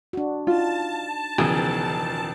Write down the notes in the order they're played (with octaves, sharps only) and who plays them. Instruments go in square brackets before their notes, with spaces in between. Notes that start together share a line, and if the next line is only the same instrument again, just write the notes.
[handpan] D4 F#4
[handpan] D#4 [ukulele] F4 [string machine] A5
[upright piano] E1 C#2 [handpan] D#3 F3 B3 [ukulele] G#4